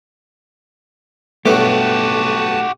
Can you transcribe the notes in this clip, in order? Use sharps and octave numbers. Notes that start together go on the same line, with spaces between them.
B1 G2 A3 B3 F#4 G4 B4 A5